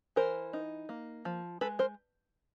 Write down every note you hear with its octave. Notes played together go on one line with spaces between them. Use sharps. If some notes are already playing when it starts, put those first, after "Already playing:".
E3 A#4 C5
D#4
A#3
F3
G#3 A4 B4
A#4 C5